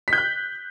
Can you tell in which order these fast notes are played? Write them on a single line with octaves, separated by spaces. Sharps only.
B6 G6 F#6